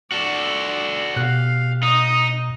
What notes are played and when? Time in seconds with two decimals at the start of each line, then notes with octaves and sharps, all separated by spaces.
0.12 F#4 A4 D5
1.16 B2 G4 F5 F#6
1.83 D#4 D#5 D#6